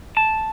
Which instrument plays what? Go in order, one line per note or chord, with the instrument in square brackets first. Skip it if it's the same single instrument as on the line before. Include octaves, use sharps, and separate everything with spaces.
[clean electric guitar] A5